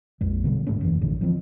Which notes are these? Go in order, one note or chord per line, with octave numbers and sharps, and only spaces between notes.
A#1 F2 G#3
B2 D3 G3
C#2 G#2 A3 C#4
F#1 E2 E3
A#1 A#2 D3
E3 F3 A3 C4